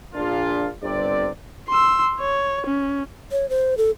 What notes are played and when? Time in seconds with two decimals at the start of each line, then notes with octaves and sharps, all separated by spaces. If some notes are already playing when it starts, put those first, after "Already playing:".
0.14 A#1 A#2 D4 F4
0.82 G1 G2 C3 C4 D5
1.69 C6 E6
2.20 C#5
2.66 C#4
3.32 C#5
3.50 C5
3.77 A4